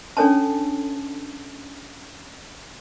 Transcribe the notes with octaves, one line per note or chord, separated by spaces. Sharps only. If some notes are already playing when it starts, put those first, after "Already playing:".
C#4 D4 A4 C#5 G#5 A5